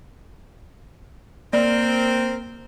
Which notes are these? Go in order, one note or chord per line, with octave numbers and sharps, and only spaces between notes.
A#3 C4 A#4 D5